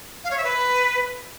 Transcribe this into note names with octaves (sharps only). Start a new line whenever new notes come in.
F5
C#5
E5
B4